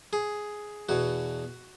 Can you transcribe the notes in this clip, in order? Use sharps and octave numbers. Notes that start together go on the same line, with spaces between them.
G#4
E2 B2 F#4